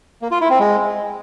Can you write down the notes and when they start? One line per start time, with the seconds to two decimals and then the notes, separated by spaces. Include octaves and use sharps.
0.22 A#3
0.31 F4
0.41 E4
0.50 C4
0.60 G#3